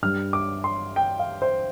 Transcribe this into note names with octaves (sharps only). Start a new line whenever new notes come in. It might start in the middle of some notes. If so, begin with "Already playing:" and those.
G2 G3 F6
D6
C6
G5
F5
C5